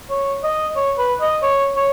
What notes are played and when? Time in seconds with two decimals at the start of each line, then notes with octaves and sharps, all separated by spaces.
0.10 C#5
0.44 D#5
0.76 C#5
0.98 B4
1.21 D#5
1.43 C#5
1.76 C#5